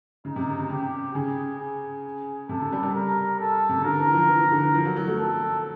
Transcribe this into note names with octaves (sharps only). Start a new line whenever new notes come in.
C#3 D#4
C3
C#3
C#3
C#3 G4
C#3 G#4
G#4
C3 A4
C#3
G3
G3
A#4
A4
C3
C#3
D3 A#4
E3
F3
E3
E3
D3
E3
F3
F#3
F#3
A3
A4